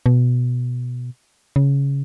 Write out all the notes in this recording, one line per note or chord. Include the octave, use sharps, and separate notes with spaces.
B2
C#3